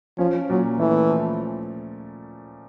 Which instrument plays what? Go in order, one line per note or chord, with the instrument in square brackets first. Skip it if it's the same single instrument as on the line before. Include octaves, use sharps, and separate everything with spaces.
[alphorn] F3 [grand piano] C#4
[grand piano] A#2 [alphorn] F#3
[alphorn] E3 [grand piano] A3
[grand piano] F3